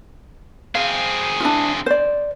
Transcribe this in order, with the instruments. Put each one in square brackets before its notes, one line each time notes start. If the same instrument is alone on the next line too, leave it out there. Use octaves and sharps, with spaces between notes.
[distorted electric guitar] C4 G#4 [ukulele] F5
[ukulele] D4 E4 F4
C5 D5